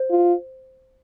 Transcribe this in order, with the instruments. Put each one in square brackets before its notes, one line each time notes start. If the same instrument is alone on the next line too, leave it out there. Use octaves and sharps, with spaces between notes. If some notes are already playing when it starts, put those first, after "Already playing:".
Already playing: [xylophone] C5
[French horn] F4